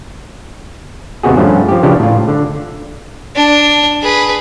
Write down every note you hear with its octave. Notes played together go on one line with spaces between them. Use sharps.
D#2 C3 B3 F#4 G#4
G2 F3 A3 C#4
F3 G4
C#3 E3 F3 D4 G4
A2 F4
D3
D4
G#4 B4